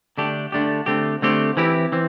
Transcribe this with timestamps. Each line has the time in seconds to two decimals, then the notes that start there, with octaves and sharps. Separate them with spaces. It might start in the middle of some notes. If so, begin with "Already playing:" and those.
0.18 D3 A3 D4 G4
0.52 D3 A3 D4 G4
0.86 D3 A3 C4 G4
1.22 D3 A3 C4 G4
1.57 E3 C4 E4 G4
1.92 E3 C4